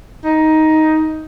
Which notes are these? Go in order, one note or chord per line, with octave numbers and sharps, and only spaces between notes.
D#4